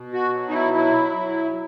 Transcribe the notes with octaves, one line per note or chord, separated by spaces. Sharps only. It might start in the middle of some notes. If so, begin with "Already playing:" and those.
Already playing: B2
F#4
F#3
D#4
E4
F#3 E4
F#3